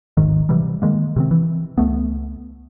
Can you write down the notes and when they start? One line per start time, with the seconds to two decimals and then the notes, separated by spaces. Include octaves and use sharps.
0.17 D#1 G#1 G#2 D#3
0.49 C3 E3 F#3 G3
0.82 D#3 G#3 A#3
1.16 C3 D#3 C4
1.31 E3
1.78 C#2 A3 B3